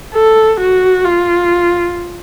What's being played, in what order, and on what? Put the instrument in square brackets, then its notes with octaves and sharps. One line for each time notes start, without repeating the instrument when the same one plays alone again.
[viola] A4
F#4
F4